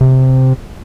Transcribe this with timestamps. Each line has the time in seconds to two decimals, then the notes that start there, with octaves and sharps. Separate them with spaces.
0.01 C3